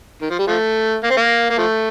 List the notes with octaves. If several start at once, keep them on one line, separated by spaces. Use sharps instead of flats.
D#3
F3
G3
F3 A3
A#3
C4
A#3
A#3
F3 A3